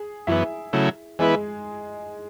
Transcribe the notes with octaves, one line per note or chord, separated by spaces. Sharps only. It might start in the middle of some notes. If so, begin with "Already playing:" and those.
Already playing: G#4
F#2 E3 B3 E4 E5
C#3 F#3 A3 E4
E3 G#3 B3 E4 G#4 B4